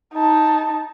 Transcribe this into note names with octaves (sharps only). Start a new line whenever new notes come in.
D#4 A5